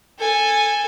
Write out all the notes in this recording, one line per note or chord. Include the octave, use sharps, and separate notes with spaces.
A4 G#5